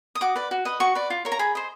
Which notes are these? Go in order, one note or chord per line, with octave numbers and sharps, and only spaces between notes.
D#6
F#4 D6
B4 D5
F#4
B4 D#5
F#4 C#6
B4 D5
F4
A#4 C#5
A#5
G#4 B5
C5 D#5